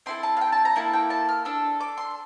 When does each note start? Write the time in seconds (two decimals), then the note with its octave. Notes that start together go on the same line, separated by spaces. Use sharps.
0.06 C4 E4 A4 C6
0.23 A5
0.37 F5
0.41 G5
0.52 A5
0.65 A#5
0.76 A#3 E4 A4 A5
0.93 G5
1.10 A5
1.29 F6
1.45 D4 A4 E6
1.81 D6
1.98 C6